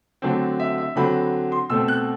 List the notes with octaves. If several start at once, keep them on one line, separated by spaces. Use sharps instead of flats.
D3 F#3 A3 C4
E5
E5
D3 F#3 C4 B5
C6
B2 A3 C4 E6
F#6